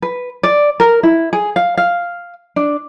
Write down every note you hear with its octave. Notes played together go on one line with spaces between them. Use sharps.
B4
D5
A#4
E4
G#4
F5
F5
D4